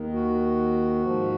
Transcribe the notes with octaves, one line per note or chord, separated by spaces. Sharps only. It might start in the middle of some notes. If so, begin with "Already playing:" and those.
Already playing: D#2 D#3
F#4
G#2 F3